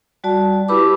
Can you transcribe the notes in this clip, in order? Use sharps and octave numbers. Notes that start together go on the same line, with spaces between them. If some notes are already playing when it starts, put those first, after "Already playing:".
G3 F#4 D5 A5
E4 G4 B4 B5 D6